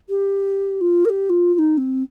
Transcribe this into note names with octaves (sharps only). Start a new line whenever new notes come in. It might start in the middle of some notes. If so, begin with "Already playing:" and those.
G4
F4
A#4
G4
F4
F4
D#4
C4